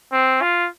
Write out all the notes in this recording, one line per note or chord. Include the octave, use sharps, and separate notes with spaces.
C4
F4